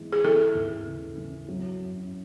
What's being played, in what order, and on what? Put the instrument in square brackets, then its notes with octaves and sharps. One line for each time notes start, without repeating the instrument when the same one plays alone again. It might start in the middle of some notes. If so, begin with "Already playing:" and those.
Already playing: [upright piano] E3 G#3
[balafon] G#4
[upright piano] E3 [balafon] A4
[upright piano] D#2
C#3
E3
F#3
F#2